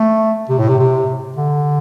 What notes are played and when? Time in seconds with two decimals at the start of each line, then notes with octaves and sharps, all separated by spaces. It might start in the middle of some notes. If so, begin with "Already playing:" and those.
Already playing: A3
0.49 C3
0.59 A2
0.68 C3
0.79 C3
1.36 D3